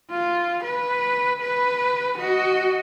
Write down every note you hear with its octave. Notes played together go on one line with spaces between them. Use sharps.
F4
B4
B4
F#4 D#5